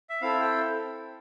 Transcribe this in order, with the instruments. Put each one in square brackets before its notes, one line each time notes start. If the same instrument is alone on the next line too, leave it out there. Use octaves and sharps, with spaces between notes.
[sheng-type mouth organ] E5
C4 E4 A4 F5
G5